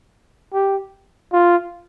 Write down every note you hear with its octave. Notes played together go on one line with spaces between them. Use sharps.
G4
F4